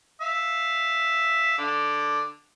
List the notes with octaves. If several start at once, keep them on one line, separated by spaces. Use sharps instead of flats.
E5 F5
D3 D6